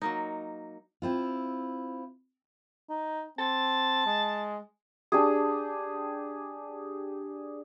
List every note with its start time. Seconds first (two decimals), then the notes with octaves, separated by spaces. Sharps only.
0.02 F#3 A#3 D#4
1.02 C4 E4 F4
2.90 D#4
3.39 C4 A5
4.06 G#3
5.12 D4 G4 G#4